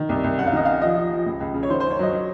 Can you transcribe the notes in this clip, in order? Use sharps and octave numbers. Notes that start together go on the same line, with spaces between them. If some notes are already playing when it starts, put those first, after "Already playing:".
Already playing: D#3
C2
C2
F#2 F#5
F5
D#3 D#5
F#2 F5
F3 D#5
F3
F3
C#2
C#2
C#3
C#5
D#3 C5
C5
F#2
C#5
F#3 D#5
F#3